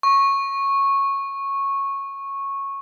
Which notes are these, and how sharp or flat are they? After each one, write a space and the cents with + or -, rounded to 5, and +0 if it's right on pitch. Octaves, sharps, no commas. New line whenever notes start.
C#6 -10